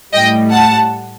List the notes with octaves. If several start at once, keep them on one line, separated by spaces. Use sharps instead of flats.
A2 G3 D#5 G5
F#5 A5